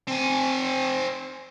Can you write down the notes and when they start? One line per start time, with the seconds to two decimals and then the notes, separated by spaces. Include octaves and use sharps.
0.08 C4 G#5